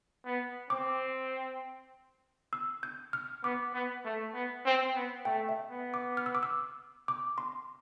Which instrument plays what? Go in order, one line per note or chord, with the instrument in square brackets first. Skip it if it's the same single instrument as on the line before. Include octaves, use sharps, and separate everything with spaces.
[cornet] B3
[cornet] C4 [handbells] D6
[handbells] E6
G6
F6
[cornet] B3 [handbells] D6
[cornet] B3
A3
B3
C4
B3
[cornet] A3 [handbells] G5
[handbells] E5
[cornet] B3
[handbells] D6
F6
E6
D6
E6
D6
C6